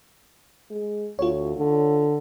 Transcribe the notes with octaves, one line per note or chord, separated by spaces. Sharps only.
G#3
D2 F4 C#5
D3